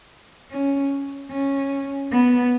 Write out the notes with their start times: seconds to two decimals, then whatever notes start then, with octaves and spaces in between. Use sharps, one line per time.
0.51 C#4
1.31 C#4
2.11 B3